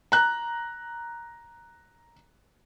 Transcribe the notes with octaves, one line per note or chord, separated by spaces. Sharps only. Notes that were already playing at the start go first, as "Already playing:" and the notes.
A#5 F#6